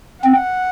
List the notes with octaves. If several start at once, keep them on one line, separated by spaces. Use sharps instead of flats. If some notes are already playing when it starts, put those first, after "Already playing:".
C4 F#5